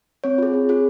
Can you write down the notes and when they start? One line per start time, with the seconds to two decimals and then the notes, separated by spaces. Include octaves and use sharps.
0.24 C4 C#5
0.38 F4 G#4
0.54 C4
0.69 F4 G#4